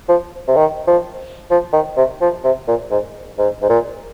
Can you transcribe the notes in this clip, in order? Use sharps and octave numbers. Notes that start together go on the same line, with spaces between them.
F3
C3
D#3
F3
F3
D#3
C3
F3
C3
A#2
G#2
G#2
G#2
A#2